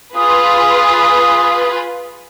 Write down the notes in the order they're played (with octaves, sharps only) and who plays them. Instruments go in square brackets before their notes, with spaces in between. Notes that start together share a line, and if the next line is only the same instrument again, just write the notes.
[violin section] F4 G#4 B4 [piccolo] D#6